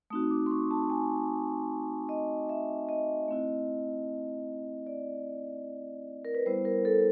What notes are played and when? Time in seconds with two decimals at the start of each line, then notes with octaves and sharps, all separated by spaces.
0.10 A3 C4 D#4 F#4 D#6
0.31 D6
0.46 C6
0.51 C#6
0.71 A5
0.90 G#5
2.09 D#5
2.49 E5
2.89 D#5
3.28 A3 C4 E4
4.86 D5
6.25 A#4
6.35 B4
6.46 G3 B3 E4 C5
6.65 A#4
6.85 A4